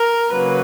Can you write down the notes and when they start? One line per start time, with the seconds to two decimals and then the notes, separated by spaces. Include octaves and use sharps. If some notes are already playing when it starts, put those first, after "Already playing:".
Already playing: A#4
0.32 C#3 F#3 A#3 B4